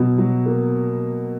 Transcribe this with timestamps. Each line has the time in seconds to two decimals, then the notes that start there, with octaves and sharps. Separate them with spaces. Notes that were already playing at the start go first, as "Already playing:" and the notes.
Already playing: B2 F#3
0.18 F#3
0.46 A#3